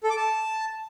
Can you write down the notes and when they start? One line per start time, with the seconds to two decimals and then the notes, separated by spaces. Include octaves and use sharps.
0.03 A4
0.10 D6
0.16 A5